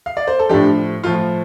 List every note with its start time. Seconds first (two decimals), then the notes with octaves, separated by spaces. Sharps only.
0.06 F5
0.17 D5
0.28 C5
0.39 A4
0.49 A2 F3 D4 G4
1.04 A2 F3 F4